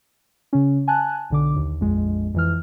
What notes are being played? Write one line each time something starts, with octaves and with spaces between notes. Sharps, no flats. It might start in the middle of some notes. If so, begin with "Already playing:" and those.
C#3 C#4
G#5 A5 F#6
B1 D3 D6
D#2
A#1 F2 G#3
F2 E3 F6